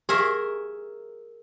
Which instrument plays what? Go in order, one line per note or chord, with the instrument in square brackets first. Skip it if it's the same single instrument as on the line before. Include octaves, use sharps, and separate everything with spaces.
[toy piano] G4 F5 C#6 [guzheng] G#4 A#4 E5